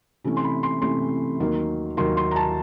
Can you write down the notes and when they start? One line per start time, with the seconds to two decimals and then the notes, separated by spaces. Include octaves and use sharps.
0.24 C3 E3 A3 C#4
0.37 C6
0.44 B5
0.63 C6
0.82 C3 E3 A3 C#4 C6
1.40 D#2 D#3 F#3 A#3
1.97 D#2 D#3 F#3 A#3 C6
2.17 C6
2.31 A#5
2.36 A5